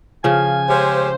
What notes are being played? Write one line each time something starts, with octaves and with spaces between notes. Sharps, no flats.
C#3 F3 G#5
G#3 C#4 G4 C5